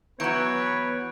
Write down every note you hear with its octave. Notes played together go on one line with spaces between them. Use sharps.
E3 F#3 B3 B4 C#5 A#5 G6 D7